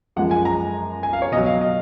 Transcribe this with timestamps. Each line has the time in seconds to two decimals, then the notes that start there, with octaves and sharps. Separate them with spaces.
0.16 F#2 F3 G#3 F#5
0.31 G#5
0.45 A#5
1.03 G#5
1.13 F5
1.22 C#5
1.32 B2 D#5
1.37 F#3
1.46 F5
1.61 D#5